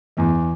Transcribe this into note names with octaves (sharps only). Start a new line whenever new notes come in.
E2 E3